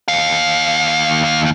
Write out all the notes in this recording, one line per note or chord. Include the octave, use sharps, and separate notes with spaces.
D#2 F5